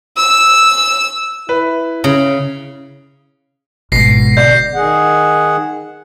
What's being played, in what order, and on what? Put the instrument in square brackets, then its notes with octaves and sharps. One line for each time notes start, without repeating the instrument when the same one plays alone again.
[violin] E6
[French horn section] E4 [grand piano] B4
[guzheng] C#3
[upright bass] G#1 G#3 [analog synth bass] B2 [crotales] A#6 C7
[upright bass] D3 [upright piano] D5 [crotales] G6
[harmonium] D#3 G#4 F#5